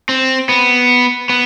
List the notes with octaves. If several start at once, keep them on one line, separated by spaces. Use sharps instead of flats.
C4
B3
B3